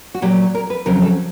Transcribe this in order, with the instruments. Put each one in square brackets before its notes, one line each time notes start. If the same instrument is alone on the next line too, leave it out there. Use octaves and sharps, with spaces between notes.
[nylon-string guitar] F#4
A#2 F#3 G4
A#4
B4
F2 C#3 F#3 A#4
A4